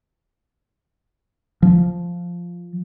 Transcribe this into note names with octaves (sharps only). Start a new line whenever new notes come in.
F3